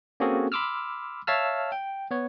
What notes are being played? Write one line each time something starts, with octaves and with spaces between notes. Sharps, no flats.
A#3 C4 C#4 F#4 G#4 A4
B5 C6 D6 E6 F6
C#5 E5 F5 A5 E6 F6
G5
B3 C#5